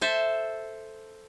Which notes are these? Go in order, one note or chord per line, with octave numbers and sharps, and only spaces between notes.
A4 C5 E5 A5